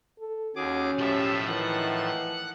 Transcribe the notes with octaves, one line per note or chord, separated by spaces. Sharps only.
A4
D#2 C#4 F#4 G#4 D6
B1 A2 F3 G4 E5
D#3 E3 F#5